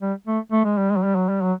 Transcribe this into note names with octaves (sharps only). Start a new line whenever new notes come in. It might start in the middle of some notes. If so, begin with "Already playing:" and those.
G3
A3
A3
G#3
G3
G#3
F#3
G3
F#3
G3
F#3